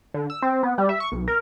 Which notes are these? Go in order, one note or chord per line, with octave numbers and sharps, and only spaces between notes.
D3
E6
C4
B3
G3
E5
C#6
B1
A#4